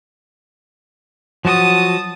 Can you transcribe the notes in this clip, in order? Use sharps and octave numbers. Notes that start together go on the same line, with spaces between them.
F3 F#3 F#4 A5 D#6